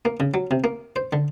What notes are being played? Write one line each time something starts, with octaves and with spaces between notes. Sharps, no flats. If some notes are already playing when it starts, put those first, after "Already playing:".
A#3
C#3
F#3
C3
A#3
C5
D3